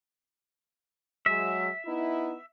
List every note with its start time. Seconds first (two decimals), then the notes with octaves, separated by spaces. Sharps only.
1.26 F#3 G#3 E5
1.86 B3 D#4 E4